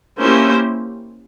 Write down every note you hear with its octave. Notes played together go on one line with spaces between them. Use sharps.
A#3 C#4 E4 G4 C5